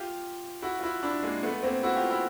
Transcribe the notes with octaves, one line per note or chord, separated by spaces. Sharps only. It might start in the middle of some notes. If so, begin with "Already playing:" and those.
Already playing: F4 G4
E4 F#4
F4
E4 F#4
D4 E4
G#3 A#3
A3 B3
A#3 C4
E4 F#4
F4 G4
E4 F#4